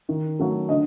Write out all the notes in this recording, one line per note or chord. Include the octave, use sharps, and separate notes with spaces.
D#3
F#3 A3
D3 D#5